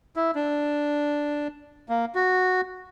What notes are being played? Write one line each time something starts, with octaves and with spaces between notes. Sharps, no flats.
E4
D4
A#3
F#4